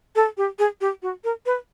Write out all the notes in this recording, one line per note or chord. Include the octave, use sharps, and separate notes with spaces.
A4
G4
G#4
G4
F#4
A#4
B4